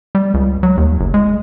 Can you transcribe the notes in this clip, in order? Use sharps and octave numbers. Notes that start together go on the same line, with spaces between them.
G3
C#2
F#3
D#2
F#1
G#3